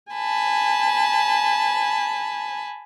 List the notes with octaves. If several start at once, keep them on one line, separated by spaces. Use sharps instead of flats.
G#5 A5 B5